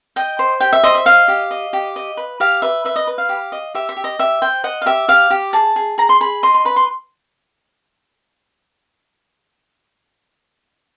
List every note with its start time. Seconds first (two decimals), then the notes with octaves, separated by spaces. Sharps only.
0.16 D#5 G5
0.39 C5
0.60 G4 G5
0.73 E5
0.83 C5 D#5
0.95 E5
1.06 D#5 F5
1.28 G4
1.51 D#5
1.73 G4
1.96 D#5
2.17 B4
2.40 G4 F5
2.62 B4 E5
2.85 B4 E5
2.96 D#5
3.07 B4
3.18 F5
3.29 G4
3.52 D#5
3.75 G4 E5
3.89 E5
3.97 G4
4.04 D#5
4.19 G4 E5
4.41 C5 G5
4.64 D#5 F#5
4.82 F5
4.86 G4 E5
5.08 G4 F5
5.30 G4
5.53 G#4 A5
5.76 G#4
5.98 G#4 A#5
6.09 C6
6.21 G#4 B5
6.43 D#5 C6
6.54 C6
6.65 B4 B5
6.76 C6